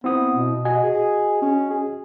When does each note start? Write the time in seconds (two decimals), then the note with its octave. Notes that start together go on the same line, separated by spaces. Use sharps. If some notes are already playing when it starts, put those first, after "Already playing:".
0.04 B3 C4 E4 D#6
0.35 B2
0.65 F#4 D#5 G#5
0.83 G#4
1.42 C#4
1.70 G#4